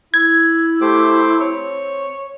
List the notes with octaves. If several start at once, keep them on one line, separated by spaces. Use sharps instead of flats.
E4 G#6
A3 G4 C5 D6
C4 C#5